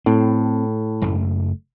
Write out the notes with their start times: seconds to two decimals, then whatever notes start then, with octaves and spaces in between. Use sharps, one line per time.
0.06 A2 C4
1.02 F#1 F#2 A3